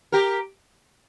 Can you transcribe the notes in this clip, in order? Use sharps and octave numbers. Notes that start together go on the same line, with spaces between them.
G4 A#4